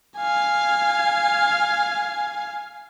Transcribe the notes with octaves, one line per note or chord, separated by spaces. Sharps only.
F5 G#5